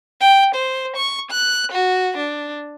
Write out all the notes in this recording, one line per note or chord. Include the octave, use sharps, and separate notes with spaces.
G5
C5
C#6
F#6
F#4
D4